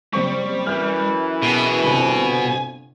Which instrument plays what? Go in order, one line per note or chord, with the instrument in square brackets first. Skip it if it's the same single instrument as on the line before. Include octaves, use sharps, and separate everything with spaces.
[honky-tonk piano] F#1 C4 C#6 [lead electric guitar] G3
[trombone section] F#2 E3 [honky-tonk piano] F6 G6
[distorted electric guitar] B2 [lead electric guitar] G#4
[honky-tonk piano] G1 C3 [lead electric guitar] G#5